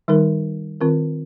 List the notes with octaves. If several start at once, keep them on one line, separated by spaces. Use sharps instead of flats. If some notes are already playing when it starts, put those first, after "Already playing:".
D#3 G3 D#4 A#4
D#3 C4 F4 A#4